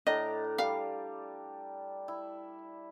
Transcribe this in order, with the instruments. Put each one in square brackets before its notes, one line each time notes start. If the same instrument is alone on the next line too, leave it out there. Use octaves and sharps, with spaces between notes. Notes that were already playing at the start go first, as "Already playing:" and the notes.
[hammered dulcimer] A2 D4 A#5 [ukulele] D#5
[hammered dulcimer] G3 [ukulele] F5
[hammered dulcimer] E4